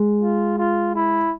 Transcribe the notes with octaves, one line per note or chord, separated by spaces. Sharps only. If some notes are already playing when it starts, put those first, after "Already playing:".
Already playing: G#3
F4
F4
E4